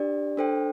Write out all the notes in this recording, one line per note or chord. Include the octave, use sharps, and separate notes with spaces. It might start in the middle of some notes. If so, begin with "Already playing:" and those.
Already playing: D4 G4 D5
D4 A4 C5 G5